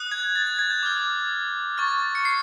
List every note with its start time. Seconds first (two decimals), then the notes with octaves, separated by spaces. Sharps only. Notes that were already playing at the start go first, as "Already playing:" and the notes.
Already playing: D#6 F#6
0.12 G#6
0.35 A6
0.47 A6
0.59 G#6
0.70 G6
0.83 D6 F6 G#6
1.77 C#6 F6 A6
2.15 C#7
2.25 C7